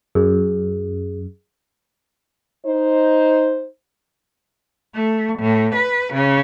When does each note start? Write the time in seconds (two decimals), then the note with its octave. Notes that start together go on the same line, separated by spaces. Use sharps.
0.15 F#2 G#4
2.65 D#4 C5
4.94 A3
5.38 A2
5.73 B4
6.12 C#3